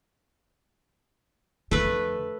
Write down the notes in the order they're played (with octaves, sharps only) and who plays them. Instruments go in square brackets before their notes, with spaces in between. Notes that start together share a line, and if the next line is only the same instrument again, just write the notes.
[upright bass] F2 D3 [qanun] A3 B4